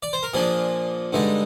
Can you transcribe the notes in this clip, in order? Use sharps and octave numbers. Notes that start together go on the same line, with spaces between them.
D5
C5
A#4
A#2 F3 A#3 D4 G#4
G2 D3 G#3 D#4